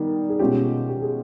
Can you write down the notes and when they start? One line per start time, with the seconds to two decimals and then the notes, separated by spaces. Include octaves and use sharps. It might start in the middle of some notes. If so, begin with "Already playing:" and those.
Already playing: D#3 G3 B3
0.29 G#4
0.39 B2 G#3 C#4 F4 G4
0.89 G4
1.01 G#4